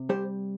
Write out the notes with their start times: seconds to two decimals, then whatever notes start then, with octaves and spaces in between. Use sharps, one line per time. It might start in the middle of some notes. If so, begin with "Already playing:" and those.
Already playing: C3
0.09 G3 G4 C5